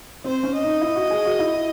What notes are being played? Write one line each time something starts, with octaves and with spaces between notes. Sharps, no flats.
C4 C5
C#4
D#5
D#4
E4
F#4
G#4
F#4
E4